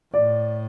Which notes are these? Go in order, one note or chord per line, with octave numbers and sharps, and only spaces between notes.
A2 D5